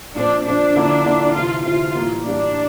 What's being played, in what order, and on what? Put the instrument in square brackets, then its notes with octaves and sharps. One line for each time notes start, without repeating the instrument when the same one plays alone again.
[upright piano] A#2 F3 C4 [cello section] D4
[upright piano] A#2 F3 C4 [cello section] D4
[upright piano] D3 F3 A#3 E4
D3 F3 A#3 E4
[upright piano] D2 C3 E3 [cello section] F4
[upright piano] D2 C3 E3 [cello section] F4
[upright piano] A2 E3 G3 A#3
[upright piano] A2 E3 G3 A#3 [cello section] D4